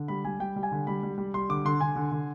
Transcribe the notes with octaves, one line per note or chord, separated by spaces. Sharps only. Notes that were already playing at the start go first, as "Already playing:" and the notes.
Already playing: D3
G3 B5
G3 G#5
G3 G5
G3
G#5
D3
G3 B5
G3
G3
G3 C6
D3 D6
D3 C6
D3 G#5
D3
D3